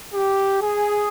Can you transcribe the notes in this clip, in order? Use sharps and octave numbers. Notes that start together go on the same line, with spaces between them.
G4
G#4